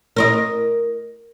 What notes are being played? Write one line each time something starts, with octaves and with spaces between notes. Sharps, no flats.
A#4 C5 D#5